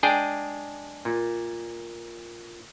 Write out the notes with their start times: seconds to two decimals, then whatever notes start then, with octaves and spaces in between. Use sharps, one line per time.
0.03 G#3 D4 G#4 G5
1.05 A#2